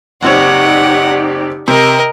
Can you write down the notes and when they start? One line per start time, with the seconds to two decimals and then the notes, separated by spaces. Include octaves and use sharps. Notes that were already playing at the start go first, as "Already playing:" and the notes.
0.23 F#1 C4 D#4 G4 C#5 D5 F#5
1.68 C3 A#4 D#5